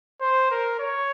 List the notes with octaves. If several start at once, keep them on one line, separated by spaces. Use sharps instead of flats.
C5
A#4
C#5